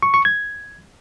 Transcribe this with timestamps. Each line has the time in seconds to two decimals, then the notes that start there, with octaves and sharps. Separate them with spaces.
0.02 C#6
0.14 C#6
0.25 G#6